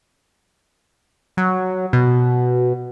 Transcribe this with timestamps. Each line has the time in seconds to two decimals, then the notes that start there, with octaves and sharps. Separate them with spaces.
1.37 F#3
1.93 B2